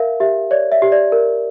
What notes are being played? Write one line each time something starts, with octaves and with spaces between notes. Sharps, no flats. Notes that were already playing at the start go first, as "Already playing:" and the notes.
Already playing: A#4 E5 F5
G4 E5
C#5 D5
E5
G4
D5
A#4